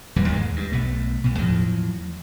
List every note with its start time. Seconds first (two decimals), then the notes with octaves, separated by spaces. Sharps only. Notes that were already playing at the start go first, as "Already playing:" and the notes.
0.16 D#1 E2 E3 G3
0.28 D#2 G#2 F#3 G#3
0.56 G2
0.72 B1 B2 A3
1.24 C2 B2
1.38 E2 A2 F3 F#3